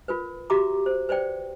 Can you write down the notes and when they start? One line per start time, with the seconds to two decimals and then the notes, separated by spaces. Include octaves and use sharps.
0.08 F4 A#4 B4
0.50 F#4 G4 E5 A#5 D6
0.86 C5
1.09 B4 C5 D5 G5